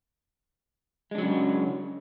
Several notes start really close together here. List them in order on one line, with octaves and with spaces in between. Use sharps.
G#3 D4 F#3 C#3